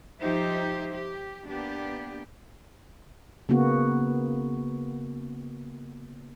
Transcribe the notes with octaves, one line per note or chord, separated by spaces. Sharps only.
F3 D#4 G4 C5 E5
G4
A#3 B3 D4 G4
C#3 A#3 B3 F#4